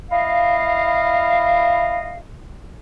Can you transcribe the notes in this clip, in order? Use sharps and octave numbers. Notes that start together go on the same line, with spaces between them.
E4 D#5 F5